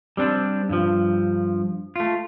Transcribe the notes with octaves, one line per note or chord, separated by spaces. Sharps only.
G3 C4 D4
G2 F3
A3 F4